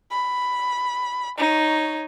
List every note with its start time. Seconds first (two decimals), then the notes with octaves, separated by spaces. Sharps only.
0.11 B5
1.39 D#4 C#5